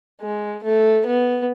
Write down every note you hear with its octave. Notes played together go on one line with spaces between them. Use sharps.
G#3
A3
B3